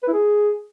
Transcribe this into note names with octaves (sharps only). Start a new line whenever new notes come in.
B4
E4
G#4